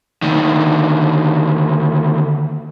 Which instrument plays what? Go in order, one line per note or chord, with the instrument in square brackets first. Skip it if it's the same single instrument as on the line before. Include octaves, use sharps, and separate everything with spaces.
[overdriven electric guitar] D2 D#3